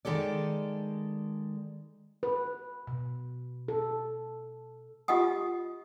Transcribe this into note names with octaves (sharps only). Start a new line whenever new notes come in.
D#3 G#3 A4 D5
B4
B2
A4
F4 G4 D#5 F#5 D#6